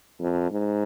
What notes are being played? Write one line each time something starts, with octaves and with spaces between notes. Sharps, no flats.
F2
G#2